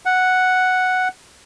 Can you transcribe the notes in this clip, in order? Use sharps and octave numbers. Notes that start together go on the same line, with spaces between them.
F#5